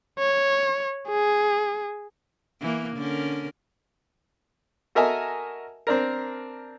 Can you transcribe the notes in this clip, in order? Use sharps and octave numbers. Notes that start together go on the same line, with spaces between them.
C#5
G#4
E3 A#3
D3 C#4 A#4
F#4 A4 A#4 D#5 E5 G#5
C4 D4 A#4